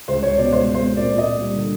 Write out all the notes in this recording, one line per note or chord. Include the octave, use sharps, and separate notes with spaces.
C#2 C5
C#2 C#5
B2 D5
G#2 C5
G#2
C5
C4
A#2 D5
A#2
D#5
A#2
G3
D3